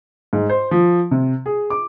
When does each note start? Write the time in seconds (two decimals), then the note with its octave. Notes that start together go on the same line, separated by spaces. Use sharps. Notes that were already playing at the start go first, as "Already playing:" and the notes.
0.33 G#2
0.49 C5
0.71 F3
1.11 C3
1.46 G#4
1.70 D6